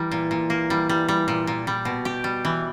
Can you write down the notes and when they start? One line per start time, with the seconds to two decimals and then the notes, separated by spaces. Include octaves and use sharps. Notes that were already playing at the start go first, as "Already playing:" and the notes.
Already playing: E3 G3 A#4
0.11 A#2
0.31 A#2
0.50 A#3
0.70 G3
0.89 G3
1.08 G3
1.28 A#2
1.47 A#2
1.67 G3
1.85 B2
2.05 G4
2.24 G3
2.45 E3